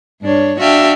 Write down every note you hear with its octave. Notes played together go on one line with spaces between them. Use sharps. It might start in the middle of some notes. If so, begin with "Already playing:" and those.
G2 D4 C#5
D4 F#4 E5 F5 G5